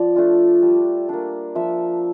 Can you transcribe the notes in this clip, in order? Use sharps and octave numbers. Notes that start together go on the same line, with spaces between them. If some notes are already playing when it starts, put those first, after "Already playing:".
Already playing: F3 D5
A3 D4 F4
G3
A#3 D4
F3 E5